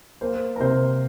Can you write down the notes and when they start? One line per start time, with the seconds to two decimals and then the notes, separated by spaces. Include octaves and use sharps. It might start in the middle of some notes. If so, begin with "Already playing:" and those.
0.21 A#3 C5
0.56 A#4
0.60 C3 C5